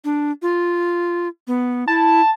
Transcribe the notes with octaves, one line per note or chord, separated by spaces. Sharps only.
D4
F4
B3
E4 A5